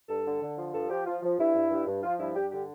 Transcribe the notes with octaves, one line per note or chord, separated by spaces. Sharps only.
G2 A4
D3
D3
F3
G2 A4
F3 G4
F3 F4
F3
G2 E4
G2
G2
G2
F3 F4
G2 E4
G2 G4
D3 G4